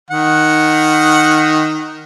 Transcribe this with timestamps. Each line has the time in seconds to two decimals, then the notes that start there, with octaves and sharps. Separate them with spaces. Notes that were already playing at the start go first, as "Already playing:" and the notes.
0.10 D#3 F#5